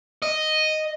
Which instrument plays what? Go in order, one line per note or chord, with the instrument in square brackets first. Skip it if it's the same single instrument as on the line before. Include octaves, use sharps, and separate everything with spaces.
[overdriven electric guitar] D#5